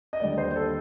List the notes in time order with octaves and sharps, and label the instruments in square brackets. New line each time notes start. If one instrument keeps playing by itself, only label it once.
[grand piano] D#5
D#2 D3 G3 D5
C5
A4